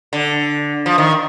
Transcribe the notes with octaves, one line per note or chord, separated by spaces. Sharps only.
D3
F3
D#3